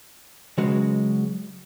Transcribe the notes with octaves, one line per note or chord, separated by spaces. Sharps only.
C#3 F#3 G#3 F#4 B4